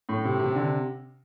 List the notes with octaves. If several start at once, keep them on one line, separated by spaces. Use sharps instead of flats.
A2
C3
C3
D3